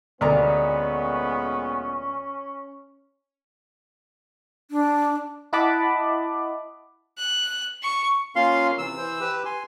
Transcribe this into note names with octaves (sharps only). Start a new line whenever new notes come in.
D2 A#2 G#3 B3 C#4 A#4 D5 A#5
D4
E4 D#5 F#5 A5 B5 D6
F#6
C#6
A#3 C#4 F4 F5 C6
C3 E3 E6
E3 C5
G4 B4
G#5 C6